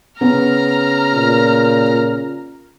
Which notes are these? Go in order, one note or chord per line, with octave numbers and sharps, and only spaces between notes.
C#3 B3 A#5 F6
A#2